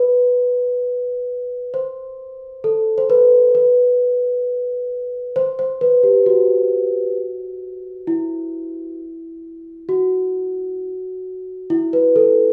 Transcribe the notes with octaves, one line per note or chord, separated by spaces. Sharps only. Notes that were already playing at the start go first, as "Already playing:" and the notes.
Already playing: B4
C5
A4
C5
B4
B4
C5
C5
B4
G4
F#4
E4
F#4
E4
B4
A4